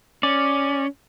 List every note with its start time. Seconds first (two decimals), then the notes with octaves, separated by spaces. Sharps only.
0.23 C#4 D5